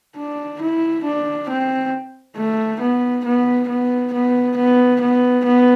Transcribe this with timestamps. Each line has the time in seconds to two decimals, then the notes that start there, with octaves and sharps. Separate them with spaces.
0.17 D4
0.62 E4
1.04 D4
1.49 C4
2.37 A3
2.81 B3
3.25 B3
3.68 B3
4.13 B3
4.57 B3
5.01 B3
5.45 B3